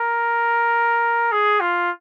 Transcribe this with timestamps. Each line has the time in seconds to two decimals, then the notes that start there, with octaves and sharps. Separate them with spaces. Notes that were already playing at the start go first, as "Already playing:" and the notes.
Already playing: A#4
1.32 G#4
1.61 F4